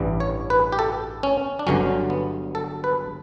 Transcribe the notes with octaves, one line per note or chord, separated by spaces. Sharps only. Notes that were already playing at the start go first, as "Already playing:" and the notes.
Already playing: A1 G2 E3 G3
C#5
B4
G4
A4
C#4
D4
G1 G2 D3 F#3 C#4
B3
A4
B4